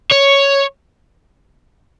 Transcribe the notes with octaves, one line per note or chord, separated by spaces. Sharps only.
C#5